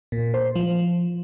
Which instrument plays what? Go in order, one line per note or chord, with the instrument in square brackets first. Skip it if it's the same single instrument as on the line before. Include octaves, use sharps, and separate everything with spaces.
[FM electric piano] A#2
C5
F3